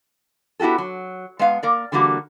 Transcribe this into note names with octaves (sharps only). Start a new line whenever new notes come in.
B3 E4 F#4 G4 A4
F#3
G#3 B3 F5
A#3 A#4 D5
D3 E3 G3 A#3 F#4